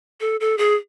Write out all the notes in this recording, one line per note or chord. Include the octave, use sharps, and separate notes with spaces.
A4
A4
G#4